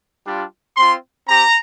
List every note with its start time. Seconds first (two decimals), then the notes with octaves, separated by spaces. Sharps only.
0.26 G3 D4 F4
0.77 C4 F4 C6
1.27 C4 G4 A#5